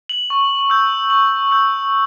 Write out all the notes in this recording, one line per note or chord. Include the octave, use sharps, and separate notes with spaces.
F#7
C#6
E6 G6
C#6 F#7
E6 G6